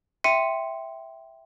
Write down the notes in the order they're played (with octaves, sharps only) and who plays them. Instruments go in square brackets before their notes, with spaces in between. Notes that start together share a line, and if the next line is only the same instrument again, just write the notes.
[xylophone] E5 G5 C6 C#7 D#7